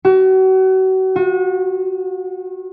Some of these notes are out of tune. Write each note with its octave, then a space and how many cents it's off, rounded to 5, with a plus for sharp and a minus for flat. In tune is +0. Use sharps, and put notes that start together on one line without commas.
F#4 +35
F#4 -35